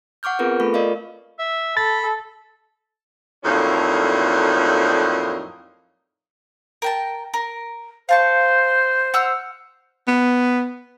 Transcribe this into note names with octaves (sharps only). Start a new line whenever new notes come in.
F#5 C#6 D6 F6 G6
B3 C4 F4 G#4 A#4 B4
A3 F4 A4 B5 C#6
A#4 D5 D#5 F5
E5
A4 B5 A6
F2 A2 F#3 A#3 D4 D#4
A#4 G5 A5
A#4
C5 F5 A5 C#6
F#5 E6 F6
B3